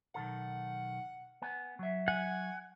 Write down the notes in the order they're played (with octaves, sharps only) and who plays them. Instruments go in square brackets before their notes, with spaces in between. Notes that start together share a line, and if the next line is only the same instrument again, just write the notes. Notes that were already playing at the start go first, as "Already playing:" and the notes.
[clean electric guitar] B1 D#3 A4 [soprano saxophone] F#5
[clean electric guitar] B3 G#5
F#3 E5
[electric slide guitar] F#5 [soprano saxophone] G#5